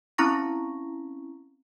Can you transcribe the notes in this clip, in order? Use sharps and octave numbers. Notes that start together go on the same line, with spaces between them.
C4 C#4 E4 A#5 C#6 A#6